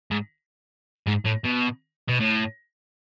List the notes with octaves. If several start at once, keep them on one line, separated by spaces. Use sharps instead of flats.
G#2
G#2
A2
B2
B2
A2